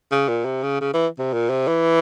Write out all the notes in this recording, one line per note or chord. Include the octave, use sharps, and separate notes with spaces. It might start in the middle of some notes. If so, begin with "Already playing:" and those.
C#3
A#2
C3
C#3
C#3
E3
C3
A#2
C3
E3